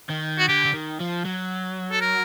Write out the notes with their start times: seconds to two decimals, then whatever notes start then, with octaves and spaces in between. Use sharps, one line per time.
0.10 D#3
0.39 F#4
0.48 D3 G4
0.65 D3
0.73 D#3
1.00 F3
1.25 F#3
1.92 A4
2.01 A#4